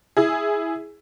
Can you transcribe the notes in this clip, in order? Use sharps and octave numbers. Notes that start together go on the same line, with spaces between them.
E4 G#4